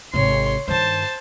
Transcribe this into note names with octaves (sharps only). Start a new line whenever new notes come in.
G#1 C3 C#5 C6
G2 D#3 C5 A5